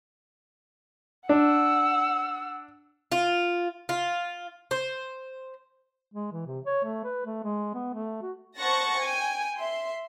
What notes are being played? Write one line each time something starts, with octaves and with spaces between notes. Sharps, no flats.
D4 F#5 E6
F4
F4
C5
G#3
E3
C3
C#5
A3
B4
A3
G#3
B3
A3
F#4
C5 F#5 A5 C#6 A6 A#6
G5 G#5
E5 C6